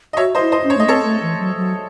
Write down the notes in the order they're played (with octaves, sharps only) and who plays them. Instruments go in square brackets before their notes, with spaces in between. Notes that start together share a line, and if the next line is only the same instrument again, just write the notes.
[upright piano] D#5
[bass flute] F#4 [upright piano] C#5 E5
[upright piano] C5 D#5
[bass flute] E4
[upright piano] C5 D#5
[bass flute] C#4
[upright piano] C#5
[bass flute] A3 [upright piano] D#5
[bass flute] C4 [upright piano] A4 C#5
[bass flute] A3
E3
F#3
F#3